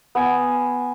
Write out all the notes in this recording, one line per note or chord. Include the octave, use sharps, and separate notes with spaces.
B3 G#5